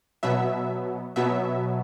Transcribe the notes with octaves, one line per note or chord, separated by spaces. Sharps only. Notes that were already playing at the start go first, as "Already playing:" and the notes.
B2 F#3 B3 E5
B2 F#3 B3 E5